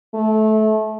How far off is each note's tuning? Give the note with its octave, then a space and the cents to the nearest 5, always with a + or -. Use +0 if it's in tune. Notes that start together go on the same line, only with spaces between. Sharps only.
A3 -20